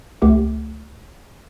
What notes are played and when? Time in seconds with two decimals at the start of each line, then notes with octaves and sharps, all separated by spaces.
0.22 C#2 A3 G4 F#5